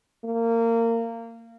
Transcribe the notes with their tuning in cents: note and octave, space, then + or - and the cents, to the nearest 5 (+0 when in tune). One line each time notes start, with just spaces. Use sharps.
A#3 -25